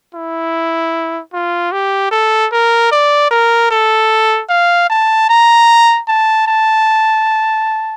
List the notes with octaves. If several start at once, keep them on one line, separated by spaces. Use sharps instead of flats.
E4
F4
G4
A4
A#4
D5
A#4
A4
F5
A5
A#5
A5
A5